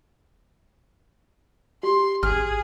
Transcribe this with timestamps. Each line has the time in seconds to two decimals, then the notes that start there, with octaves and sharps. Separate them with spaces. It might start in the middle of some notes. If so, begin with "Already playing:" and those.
1.83 G4 C6
2.23 A1 G#4 F6